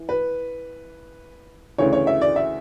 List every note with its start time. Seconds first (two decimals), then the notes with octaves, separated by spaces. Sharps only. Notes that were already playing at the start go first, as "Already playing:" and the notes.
Already playing: E3
0.09 B4
1.78 D2 C#3 E3 C#5
1.93 C#5
2.07 E5
2.21 D5
2.36 E5